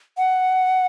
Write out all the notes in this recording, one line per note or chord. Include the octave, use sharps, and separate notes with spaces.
F#5